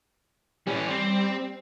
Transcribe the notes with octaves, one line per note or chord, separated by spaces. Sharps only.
E3 G3 C#4
C4